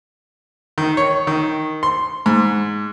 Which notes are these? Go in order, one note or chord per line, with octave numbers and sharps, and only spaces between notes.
D#3
C#5
D#3
C6
G#2